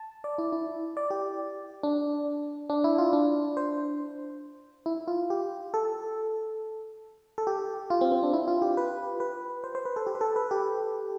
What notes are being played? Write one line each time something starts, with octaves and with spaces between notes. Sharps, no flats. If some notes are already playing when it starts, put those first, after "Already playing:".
Already playing: A5
D5
E4
E4
D5
G4
D4
D4
E4
F4
D4
C5
E4
F4
G4
A4
A4
G4
F4
C4
C4
D4
E4
F4
G4
B4
B4
C5
C5
B4
A4
G4
B4
A4
B4
G4